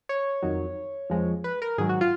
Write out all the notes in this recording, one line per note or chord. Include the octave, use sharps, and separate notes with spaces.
C#5
F2 D#3 F#3
F2 F3 G#3
B4
A#4
G#2 D#3 F#3 G#4
F#4
F4